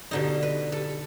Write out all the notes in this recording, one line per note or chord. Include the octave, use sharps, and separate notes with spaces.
B2 D3 D#4
B4
A4